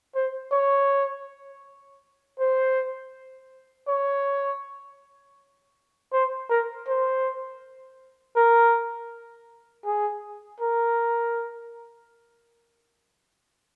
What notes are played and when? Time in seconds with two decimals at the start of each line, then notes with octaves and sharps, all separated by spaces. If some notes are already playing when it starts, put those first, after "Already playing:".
0.15 C5
0.52 C#5
2.39 C5
3.88 C#5
6.13 C5
6.50 A#4
6.87 C5
8.36 A#4
9.86 G#4
10.60 A#4